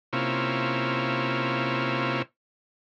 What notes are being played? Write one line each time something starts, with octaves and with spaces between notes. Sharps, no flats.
C3 A#3 C#4 E4 F4